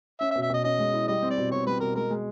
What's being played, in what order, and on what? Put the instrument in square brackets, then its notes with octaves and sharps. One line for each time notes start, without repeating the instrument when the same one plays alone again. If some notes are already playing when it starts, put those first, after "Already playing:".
[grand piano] C#4 [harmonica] E5
[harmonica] E5
[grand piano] B2
[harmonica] E5
[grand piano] B2 [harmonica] D#5
[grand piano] C#4 [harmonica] D#5
[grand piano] G#3
E4
[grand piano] G3 [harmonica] D#5
[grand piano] C4
[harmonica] D5
[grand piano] B2
[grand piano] B2 [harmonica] C#5
[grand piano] G3 [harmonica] B4
[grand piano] B2 [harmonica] A#4
[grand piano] G#3 [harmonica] A#4
[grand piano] G#3